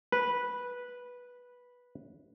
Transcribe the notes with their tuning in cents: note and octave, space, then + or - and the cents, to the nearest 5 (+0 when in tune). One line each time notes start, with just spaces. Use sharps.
B4 -10